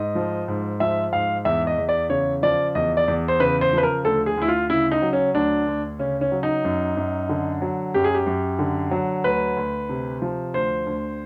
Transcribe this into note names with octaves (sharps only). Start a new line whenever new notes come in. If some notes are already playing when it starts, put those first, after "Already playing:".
Already playing: G#2 D#5
F3
G#2
F3 E5
G#2 F5
E2 E5
D#5
E2
D5
C#3 C#5
F3 D5
E2 D#5
D5
E2
C5
C#3 B4
C5
F3 B4
A#4
D2 A4
G#4
D2 E4
F4
C#3 E4
D#4
F#3
C#4
D2 D4
D2
C#3 C#4
C#4
F#3
D#4
F#2
F#2
D3
F#3
F#2 G4
G#4
G4
F#2
D3
F#3
D2 B4
D2
C3
F3
D2 C5
D2